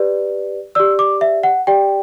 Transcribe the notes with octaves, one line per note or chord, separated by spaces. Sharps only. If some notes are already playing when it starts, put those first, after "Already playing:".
Already playing: G4 B4 D5
G4 D5 E6
D6
E5
F#5
G4 D5 G5